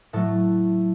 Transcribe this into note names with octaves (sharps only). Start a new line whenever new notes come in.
A2 F#3 A3 A4